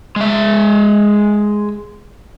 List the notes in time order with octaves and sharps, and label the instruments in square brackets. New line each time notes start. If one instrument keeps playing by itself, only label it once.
[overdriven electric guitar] G#3 E5